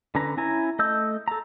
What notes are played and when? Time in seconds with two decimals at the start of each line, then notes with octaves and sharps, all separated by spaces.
0.15 D3 C#4 B4 A#5
0.37 C#4 E4 G#5 A#5
0.79 A3 D#5 E6 G6
1.28 A4 A#5